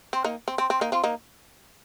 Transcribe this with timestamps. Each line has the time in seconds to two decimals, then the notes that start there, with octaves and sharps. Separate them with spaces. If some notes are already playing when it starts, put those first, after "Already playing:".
0.13 C4
0.24 A#3 D#4
0.48 C4
0.58 C4
0.70 C4
0.81 A#3 D#4
0.92 C4 F4
1.04 A#3 D#4